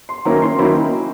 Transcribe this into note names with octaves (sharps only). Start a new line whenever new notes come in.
C6
D#3 F#3 A#3 C#4 E4 A#5
C6
D#3 F#3 A#3 C#4 E4 B5